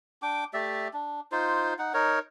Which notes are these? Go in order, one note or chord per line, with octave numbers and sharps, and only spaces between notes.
D4 G5 D6
A3 G4 D5 E5
D4
D#4 F4 C5
D#4 F#5
D#4 A#4 C#5